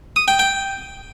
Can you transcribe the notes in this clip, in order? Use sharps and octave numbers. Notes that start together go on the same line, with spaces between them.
D#6
G5
G5